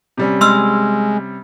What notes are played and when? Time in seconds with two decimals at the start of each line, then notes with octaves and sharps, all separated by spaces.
0.17 C3 G3 C#4
0.41 G#3 C6 E6 F6